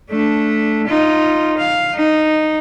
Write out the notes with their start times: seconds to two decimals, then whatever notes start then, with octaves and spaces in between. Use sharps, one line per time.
0.11 A3 D4
0.88 D#4 F4
1.58 F5
1.94 D#4